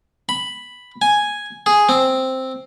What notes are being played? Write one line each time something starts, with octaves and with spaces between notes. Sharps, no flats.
B5
G#5
G#4
C4